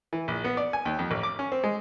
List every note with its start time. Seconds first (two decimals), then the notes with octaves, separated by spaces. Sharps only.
0.13 E3
0.28 A#1
0.44 B3
0.57 D5
0.73 G#5
0.85 D#2
0.99 F2
1.11 A1
1.23 D6
1.39 C#4
1.52 C4
1.64 G#3